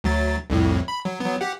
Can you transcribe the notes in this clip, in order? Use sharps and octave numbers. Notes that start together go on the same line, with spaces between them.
D2 F#3 A6
C2 F2 A2
B5
F#3
F#3 B3
G4 F#5